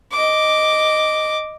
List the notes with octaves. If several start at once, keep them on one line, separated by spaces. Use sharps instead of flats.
D#5 D6